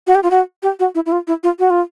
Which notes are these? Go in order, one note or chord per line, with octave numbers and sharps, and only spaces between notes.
F#4
G4
F4
F#4
G4
F#4
E4
E4
F4
E4
F4
F#4
F4